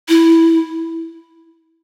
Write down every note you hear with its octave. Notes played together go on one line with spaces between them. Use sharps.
E4